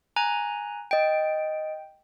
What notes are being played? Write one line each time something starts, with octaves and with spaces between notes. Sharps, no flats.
G#5 A#5 F#6
D#5 G5 D7